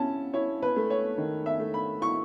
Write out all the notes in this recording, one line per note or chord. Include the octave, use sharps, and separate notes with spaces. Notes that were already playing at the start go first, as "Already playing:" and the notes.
Already playing: C#4 E4 A5
E4 C#5
B4
A3
C#5
D#3
E5
A3
B5
E4 C#6